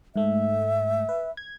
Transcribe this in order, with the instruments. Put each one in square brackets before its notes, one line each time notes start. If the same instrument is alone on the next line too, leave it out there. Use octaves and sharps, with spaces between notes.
[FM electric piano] G#2 A3 [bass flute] E5
[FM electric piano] B4
G#6